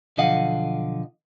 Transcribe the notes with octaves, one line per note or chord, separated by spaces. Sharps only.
B1 D3 F3 D#5 F5 F#5